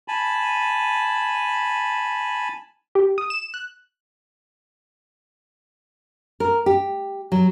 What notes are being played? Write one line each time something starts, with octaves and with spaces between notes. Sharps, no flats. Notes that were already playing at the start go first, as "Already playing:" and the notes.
G#5 A5 B5
G4
D#6
E7
F#6
A#4
G4
F#3